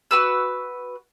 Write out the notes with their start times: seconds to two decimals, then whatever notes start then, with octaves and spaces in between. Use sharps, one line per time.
0.11 F#4 B4 E6